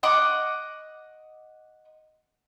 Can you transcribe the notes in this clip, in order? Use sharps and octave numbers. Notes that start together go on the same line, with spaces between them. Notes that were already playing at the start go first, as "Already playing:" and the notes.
D#5 F#5 C#6 D6